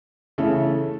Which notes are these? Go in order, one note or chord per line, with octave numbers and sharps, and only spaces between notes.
C#3 E3 A3 A4